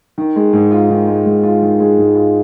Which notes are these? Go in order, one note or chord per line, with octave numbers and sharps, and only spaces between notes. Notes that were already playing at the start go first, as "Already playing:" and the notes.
D#3
G#3
G#2
F4
D#3
G#3
G#2
F4
D#3
G#3
G#2
F4